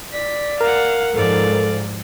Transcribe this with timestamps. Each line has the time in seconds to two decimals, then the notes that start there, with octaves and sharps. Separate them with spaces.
0.13 D5 B6
0.61 A#4 F5 F#5
1.15 G#2 F3 A4 D5 F5